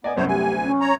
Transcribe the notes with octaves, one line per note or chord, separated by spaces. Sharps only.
B3 D5 D#5 G#5
C2 F#2 B3 C5 C#5
D2 G4 G#5
C#4
C#5 A#5